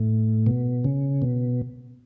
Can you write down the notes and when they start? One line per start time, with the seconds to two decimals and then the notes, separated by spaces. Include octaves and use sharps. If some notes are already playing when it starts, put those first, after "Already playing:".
Already playing: A2
0.46 B2
0.84 C#3
1.22 B2